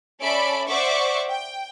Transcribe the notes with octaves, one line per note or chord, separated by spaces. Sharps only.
C#4 A4 D5 E5 B5 D7
C5 D5 E5 F#5 C#6 D6
G5